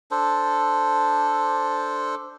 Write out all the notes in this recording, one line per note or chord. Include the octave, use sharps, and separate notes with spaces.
D4 A4 C5